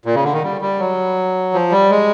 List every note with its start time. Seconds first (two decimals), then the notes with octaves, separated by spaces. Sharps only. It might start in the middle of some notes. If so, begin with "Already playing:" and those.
0.05 A#2
0.14 C#3
0.24 D3
0.33 D#3
0.43 G3
0.61 G3
0.80 F#3
1.54 F3
1.72 G3
1.90 G#3